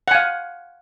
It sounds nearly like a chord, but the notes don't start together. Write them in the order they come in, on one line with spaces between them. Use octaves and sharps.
F#5 G#5 F5